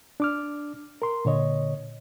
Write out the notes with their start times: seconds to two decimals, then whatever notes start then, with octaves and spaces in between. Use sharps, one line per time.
0.20 D4 D6 F6
1.02 A#4 C6
1.25 A#2 D3 C#5 D#5